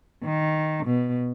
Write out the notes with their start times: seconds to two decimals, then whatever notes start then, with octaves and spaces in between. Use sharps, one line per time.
0.24 D#3
0.86 B2